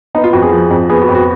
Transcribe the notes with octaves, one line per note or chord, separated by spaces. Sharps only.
B3 D#4
F4
F2 F#4
G#4
F3
F2
B3 G#4
F#4
F2
F#4